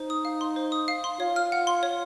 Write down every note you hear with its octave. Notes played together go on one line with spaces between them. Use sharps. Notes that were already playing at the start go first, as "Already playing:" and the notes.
Already playing: D#4 C5
D#6
F5
C6
C5
D#6
F5
C6
F4 C#5
F6
F#5
C6
C#5